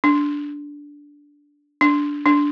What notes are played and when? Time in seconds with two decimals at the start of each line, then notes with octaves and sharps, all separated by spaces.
0.04 D4
1.81 D4
2.26 D4